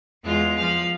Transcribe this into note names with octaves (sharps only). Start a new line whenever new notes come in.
E2 G#3 F4
F3 F5